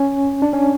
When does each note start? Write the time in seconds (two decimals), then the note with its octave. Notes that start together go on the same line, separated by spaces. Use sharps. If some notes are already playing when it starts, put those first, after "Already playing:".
Already playing: C#4
0.42 D4
0.53 C#4